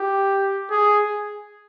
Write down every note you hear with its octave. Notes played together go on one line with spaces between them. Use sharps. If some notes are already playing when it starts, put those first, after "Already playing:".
Already playing: G4
G#4